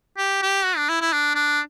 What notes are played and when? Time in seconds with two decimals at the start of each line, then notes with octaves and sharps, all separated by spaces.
0.18 G4
0.43 G4
0.65 F#4
0.77 D4
0.89 E4
1.01 E4
1.13 D4
1.36 D4